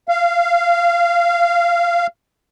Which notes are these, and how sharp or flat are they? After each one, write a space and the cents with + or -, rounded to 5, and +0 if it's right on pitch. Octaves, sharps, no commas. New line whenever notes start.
F5 -20